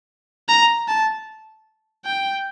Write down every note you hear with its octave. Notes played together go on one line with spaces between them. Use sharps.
A#5
A5
G5